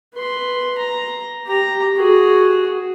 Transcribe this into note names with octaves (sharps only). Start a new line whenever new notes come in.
B4 C6
A#5
G4 A#5
F#4 G#4